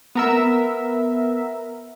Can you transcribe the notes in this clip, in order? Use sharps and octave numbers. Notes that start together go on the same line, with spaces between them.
B3 A#4 E5